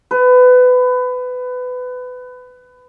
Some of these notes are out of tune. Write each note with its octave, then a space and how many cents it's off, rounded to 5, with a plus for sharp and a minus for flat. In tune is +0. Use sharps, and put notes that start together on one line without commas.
B4 +25